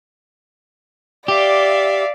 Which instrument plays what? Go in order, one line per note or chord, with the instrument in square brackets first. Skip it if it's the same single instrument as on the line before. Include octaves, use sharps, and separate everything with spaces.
[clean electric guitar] G4 [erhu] D5 [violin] E5 F5